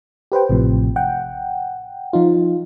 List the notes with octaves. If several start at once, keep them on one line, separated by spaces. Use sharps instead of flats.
G4 B4 C5 G5
A1 A2 C3 F3
F#5 G5
F3 D#4 F4